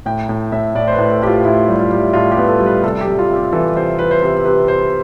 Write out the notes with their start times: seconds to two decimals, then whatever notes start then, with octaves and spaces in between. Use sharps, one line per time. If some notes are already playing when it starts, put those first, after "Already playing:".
0.06 A2 G5
0.29 A2
0.52 A2 E5
0.75 A2 D5
0.88 C5
0.93 B4
0.98 A2
1.10 A4
1.22 A2 G4
1.27 F4
1.45 A2 E4
1.68 G3
1.79 F4
1.92 G3
2.14 A2 F4
2.31 G4
2.37 B3
2.48 A4
2.60 G3
2.66 B4
2.83 C3 A4
3.01 G4
3.07 G3
3.19 F4
3.30 C3
3.35 G4
3.52 E3 A4
3.75 C3 C5
3.99 E3 B4
4.11 C5
4.22 C3 B4
4.45 C3 B4
4.68 C3 C5